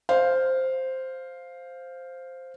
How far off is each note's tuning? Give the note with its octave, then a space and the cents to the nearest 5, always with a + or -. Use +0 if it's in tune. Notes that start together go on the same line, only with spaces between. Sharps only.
C5 +0 F5 +0